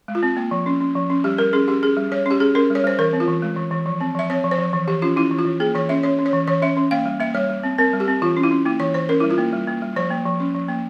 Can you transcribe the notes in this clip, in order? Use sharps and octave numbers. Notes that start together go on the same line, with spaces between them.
G#3
F4
C4
A#3
F3
C#4
C#4
F3
C#4
G3 G4
G3 A#4
C#4 G#4
C#4 G4
C#4 G#4
G3
G3 C#5
C#4 G4
C#4 G#4
C#4 A#4
G3
C#5
G3 C5
E3 A#4
C4
F4
E3
G#3
E3
E3
F3
C4
F3 E5
C4 C#5
F3
C5
F3
E3
E3 G4
C#4 F4
C#4 E4
E3
F4
E3
A#3 G#4
E3 C#5
C#4 E5
C#4 C#5
C#4
C#5
E3
E3 C#5
C#4 E5
C#4
A#3 F5
G3
A#3 E5
G3 C#5
G3
C4
C4 A#4
G3
G4
C4
E3 F4
C#4
E4
C#4
A#3 E4
E3 C#5
E3 C5
C#4 A#4
E4
G3
F4
A#3
G3
A#3
G3
F3 C5
A#3
F3
C#4
F3
A#3